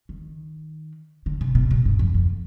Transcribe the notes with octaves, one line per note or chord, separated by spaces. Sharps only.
D#3
D3
C3
B2
A#2
G2
F2
F2